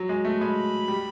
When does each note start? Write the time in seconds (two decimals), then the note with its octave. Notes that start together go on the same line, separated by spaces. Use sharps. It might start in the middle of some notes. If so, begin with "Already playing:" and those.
Already playing: F#3
0.09 G#3
0.25 A3
0.41 G#3 B5
0.88 G3